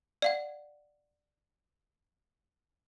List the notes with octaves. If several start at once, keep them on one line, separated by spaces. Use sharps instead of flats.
D5 F5 F#5